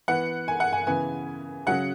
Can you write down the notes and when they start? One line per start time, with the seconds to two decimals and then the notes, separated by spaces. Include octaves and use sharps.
0.08 E3 B3 F#5
0.48 G#5
0.60 F#5
0.72 G#5
0.87 C#3 E3 B3 G#5
1.66 C#3 F#3 C#4 F#5